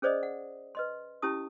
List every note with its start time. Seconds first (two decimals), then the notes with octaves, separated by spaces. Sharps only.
0.02 C#4 G#4 C5 D5 D#5 D#6
0.23 F#5
0.75 B4 D#5 C6
1.22 C#4 E4 G4 A5 D#6